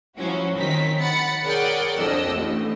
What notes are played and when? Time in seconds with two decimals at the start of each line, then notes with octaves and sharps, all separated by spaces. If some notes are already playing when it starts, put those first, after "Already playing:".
0.17 F3 F#3 C#4 E4 F#4
0.57 D#3 C4 D#4 C#5 B6
0.99 F#5 B5 A6 C#7
1.44 G#4 A#4 C#5 D5 F#5 G5
1.98 F2 D4 D#5 E6
2.36 A1